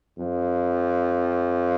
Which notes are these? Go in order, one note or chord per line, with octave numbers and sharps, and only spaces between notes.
F2